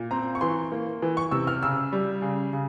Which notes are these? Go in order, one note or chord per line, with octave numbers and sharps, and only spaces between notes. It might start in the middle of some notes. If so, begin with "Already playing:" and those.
Already playing: A#2
C4 A#5
C#6
E3 C6
A#3
E3
C#6
C3 E6
F6
C#3 E6
G3
C#3
C#3